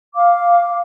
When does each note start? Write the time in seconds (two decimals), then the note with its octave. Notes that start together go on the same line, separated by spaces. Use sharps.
0.15 F5 D6